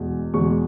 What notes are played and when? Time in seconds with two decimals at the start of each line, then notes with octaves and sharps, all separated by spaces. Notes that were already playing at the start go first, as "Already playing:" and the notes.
Already playing: E2 B2 G#3
0.34 E2 B2 G#3 C#6